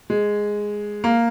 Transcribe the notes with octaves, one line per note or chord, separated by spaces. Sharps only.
G#3
A#3